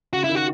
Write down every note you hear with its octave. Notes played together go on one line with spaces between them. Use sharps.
C#3 F#4
E4
D#3
F#4